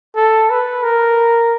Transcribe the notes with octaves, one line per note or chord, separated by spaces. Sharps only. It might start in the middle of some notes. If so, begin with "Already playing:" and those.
A4
B4
A#4